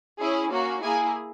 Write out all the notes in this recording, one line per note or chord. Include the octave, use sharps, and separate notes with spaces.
C#4 E4 G#4
A#3 C#4 F#4
A#3 E4 G#4 G#5